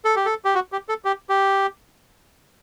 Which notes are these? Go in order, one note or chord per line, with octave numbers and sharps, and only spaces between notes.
A4
G4
A4
G4
F#4
G4
A4
G4
G4